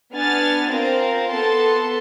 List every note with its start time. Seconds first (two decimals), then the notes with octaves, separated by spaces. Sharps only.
0.14 B3 D4 G#5 F6 A6
0.70 C4 F4 A#4 C5 F5
1.31 B3 A4 A5 C6